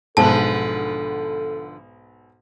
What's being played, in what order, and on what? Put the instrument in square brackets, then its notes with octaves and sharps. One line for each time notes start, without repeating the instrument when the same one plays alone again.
[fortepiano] B1 G#2 [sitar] D3 F3 B3 [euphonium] A4 [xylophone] A5